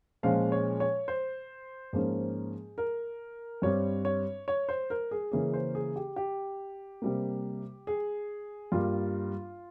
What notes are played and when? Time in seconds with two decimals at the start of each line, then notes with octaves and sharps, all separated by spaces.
0.23 A#2 F3 G#3 C#4 F5
0.52 C#5
0.80 C#5
1.08 C5
1.93 G#2 F3 A#3 C#4 G#4
2.78 A#4
3.62 G2 G3 C4 C#5
4.05 C#5
4.48 C#5
4.69 C5
4.90 A#4
5.11 G#4
5.32 C#3 E3 A#3 C#4 G#4
5.54 C5
5.75 G#4
5.96 G4
6.16 G4
7.02 C3 G3 A#3
7.87 G#4
8.72 G2 G3 A#3 F4